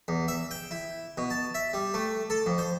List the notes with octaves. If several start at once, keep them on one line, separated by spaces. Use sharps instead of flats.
E2
E5
G5
E4
B2
A5
E5
G3
A3
A4
F2
C5